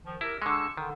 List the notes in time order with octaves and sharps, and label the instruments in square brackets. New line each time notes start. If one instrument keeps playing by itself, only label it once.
[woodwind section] D#3 F3
[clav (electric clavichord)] E4 [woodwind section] G4 A#4
[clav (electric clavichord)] D3 G#3 [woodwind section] C#6 E6
[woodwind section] D3 [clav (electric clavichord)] D#3